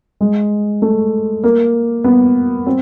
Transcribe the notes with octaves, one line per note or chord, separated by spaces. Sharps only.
G#3
A3
A#3
B3
C4